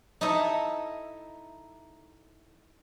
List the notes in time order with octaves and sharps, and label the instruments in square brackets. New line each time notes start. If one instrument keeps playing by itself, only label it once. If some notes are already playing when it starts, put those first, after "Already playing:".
[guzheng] D#4 E4 A4 D#5 E5